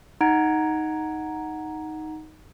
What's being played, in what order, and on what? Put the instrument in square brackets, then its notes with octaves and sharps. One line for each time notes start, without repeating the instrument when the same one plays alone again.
[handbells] D#4 F#5 A#5 G#6 D7